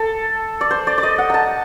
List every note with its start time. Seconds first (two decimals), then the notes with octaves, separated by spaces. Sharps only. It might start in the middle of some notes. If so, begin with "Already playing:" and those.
Already playing: A4
0.61 D5
0.71 C5
0.87 D5
0.98 D5
1.03 D#5
1.18 F#5
1.30 A5 A#5